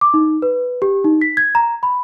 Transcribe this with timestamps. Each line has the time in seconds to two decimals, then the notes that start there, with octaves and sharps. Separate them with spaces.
0.01 D6
0.14 D#4
0.42 B4
0.82 G4
1.05 D#4
1.21 B6
1.37 G#6
1.55 A#5
1.83 B5